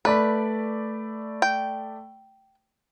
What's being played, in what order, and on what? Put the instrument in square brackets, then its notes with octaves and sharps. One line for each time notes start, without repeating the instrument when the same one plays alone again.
[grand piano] A3 D5 B5 [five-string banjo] B4
[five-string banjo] G5